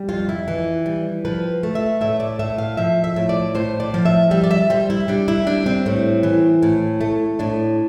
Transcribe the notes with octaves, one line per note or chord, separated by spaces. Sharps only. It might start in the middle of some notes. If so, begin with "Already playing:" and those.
Already playing: G3
F2 F4
E4
E3
G3
F3 B4
A3
E5
A2 E5
D5
A2 E5
F5
F3 E5
E5
A2
D5
A2 C5
D5
F3
E5
G3 E5
D5
E5
G3 C5
E4
G3 D4
E4
G3 D4
C4
A2
E3
A2
A3
A2 D4